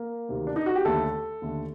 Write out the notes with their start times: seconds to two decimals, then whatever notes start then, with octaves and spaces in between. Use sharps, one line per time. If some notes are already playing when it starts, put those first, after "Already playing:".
Already playing: A#3 A#4
0.28 D2 C3 D#3
0.47 D4
0.56 D#4
0.66 F#4
0.76 G4
0.85 D#2 D3 A3 A4
1.42 D#2 D3 A3